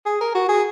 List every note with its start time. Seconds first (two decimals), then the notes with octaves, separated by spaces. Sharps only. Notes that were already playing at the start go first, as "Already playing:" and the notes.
0.06 G#4
0.21 A#4
0.35 F#4
0.49 G#4